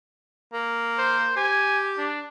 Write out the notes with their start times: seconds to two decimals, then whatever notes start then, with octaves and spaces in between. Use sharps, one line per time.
0.53 A#3
0.98 C5
1.36 G4 G#5
1.98 D4